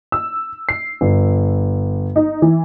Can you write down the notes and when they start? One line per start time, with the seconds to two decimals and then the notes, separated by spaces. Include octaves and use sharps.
0.12 E6
0.69 C7
1.01 G1
2.16 D#4
2.42 E3